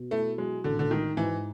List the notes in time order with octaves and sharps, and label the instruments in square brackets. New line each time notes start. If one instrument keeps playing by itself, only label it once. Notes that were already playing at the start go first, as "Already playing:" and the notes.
Already playing: [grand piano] B2
[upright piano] A3 [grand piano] E4
[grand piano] F#3 [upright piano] G#3
[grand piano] A1 [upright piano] D3
[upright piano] D3
[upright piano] D#3 [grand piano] G#3
[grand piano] G#2 [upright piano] E3